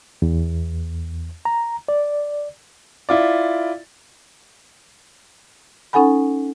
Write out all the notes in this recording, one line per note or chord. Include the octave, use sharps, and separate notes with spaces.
E2
A#5
D5
E4 F4 D5
C#4 D#4 A4 F#5 G#5 B5